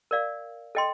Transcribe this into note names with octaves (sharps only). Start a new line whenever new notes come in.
A#4 D5 F5
A4 D#5 G5 C6